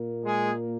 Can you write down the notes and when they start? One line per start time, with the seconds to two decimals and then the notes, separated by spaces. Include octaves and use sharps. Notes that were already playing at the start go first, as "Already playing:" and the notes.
Already playing: A#2 A#3
0.25 G#3 G#4